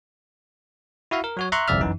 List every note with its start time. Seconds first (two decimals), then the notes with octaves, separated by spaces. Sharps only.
1.11 E4 F#4 E5 F5
1.24 A#4
1.37 F#3 F#4 C#5
1.52 E5 A#5 C6 C#6 F#6
1.68 G1 C2 F2 D5 E5 F6
1.81 F#2 E3 D#4